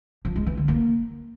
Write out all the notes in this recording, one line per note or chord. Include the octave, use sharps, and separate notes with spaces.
F3
G#3
E3
D3
A#3